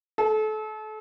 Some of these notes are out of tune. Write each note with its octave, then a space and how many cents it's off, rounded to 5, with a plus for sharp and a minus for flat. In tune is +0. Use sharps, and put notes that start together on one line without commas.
A4 -30